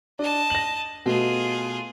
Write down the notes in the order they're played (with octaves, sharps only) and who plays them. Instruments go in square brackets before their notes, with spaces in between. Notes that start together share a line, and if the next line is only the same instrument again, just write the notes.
[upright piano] D4 [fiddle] D#5 A5
[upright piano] A#6 F#7
[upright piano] B2 A3 [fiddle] F4 G#4